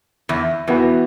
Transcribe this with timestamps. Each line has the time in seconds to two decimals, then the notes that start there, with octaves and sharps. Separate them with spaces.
0.29 E2
0.68 E2 E3 B3 F#4 B4